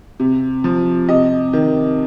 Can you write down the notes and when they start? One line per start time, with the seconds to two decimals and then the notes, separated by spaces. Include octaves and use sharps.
0.20 C3
0.64 F3
1.09 C3 D#5
1.53 D#3